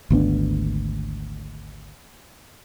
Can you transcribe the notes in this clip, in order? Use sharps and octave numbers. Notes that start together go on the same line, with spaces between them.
G#1 D2 B3 D4